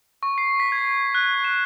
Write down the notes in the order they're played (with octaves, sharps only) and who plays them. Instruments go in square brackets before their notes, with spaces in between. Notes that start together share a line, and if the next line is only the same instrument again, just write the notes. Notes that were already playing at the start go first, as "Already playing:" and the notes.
[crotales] C#6
C7
B6
G#6
F#6
E7